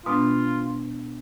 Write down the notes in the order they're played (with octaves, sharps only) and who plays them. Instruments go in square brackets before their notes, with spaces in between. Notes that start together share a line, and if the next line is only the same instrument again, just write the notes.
[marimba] B2 G#3 B3 D4 [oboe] F4